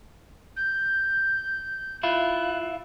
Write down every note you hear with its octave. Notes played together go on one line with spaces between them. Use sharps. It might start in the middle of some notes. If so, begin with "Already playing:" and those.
G6
E4 F4 F#6